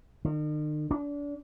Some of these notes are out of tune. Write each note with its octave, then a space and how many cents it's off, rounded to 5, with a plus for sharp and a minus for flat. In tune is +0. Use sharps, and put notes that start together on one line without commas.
D#3 -45
D4 -30